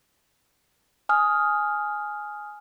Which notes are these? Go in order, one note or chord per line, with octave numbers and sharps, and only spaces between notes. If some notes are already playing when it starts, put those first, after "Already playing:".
G#5 D#6 F6